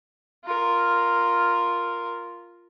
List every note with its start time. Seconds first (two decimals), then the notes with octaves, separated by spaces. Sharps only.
0.45 F4 A#4